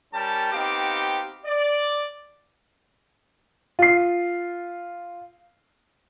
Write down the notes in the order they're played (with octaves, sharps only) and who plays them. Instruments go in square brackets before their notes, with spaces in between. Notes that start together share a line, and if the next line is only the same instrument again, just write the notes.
[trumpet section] G3 C#4 G4 A#4 A5
B3 C4 D#4 G4 F5 D6
D5
[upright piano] F4 C7